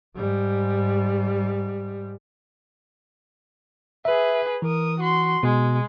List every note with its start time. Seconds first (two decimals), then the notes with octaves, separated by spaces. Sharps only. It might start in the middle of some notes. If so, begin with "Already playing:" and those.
0.16 G#2 G3
4.05 G#4 B4 E5
4.62 E3 A#4 D#6
5.00 F#4 C6
5.43 B2 G#3